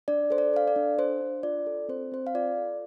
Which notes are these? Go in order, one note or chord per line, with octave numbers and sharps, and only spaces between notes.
D4 D5
A4 C5
D5
A4 F5
D5
D4
D4 C5
D4
F4 D5
A4
C4 C5
C4 C5
F5
F4 D5
A4